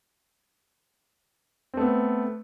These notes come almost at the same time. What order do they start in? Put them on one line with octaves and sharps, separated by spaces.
C4 A3 B3